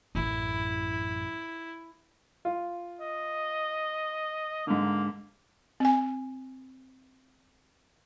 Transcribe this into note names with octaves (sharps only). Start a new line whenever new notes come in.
A1 F#2 E4
F4
D#5
G#2 D3 A#3
C4 G#5